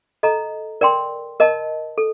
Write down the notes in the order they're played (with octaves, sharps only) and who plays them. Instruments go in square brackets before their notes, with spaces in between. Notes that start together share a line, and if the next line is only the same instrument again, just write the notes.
[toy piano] A4 D#5 A#5
A#4 D5 G5 C6
A#4 D#5 A5
A4